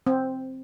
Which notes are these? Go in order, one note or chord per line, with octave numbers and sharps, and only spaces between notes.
C4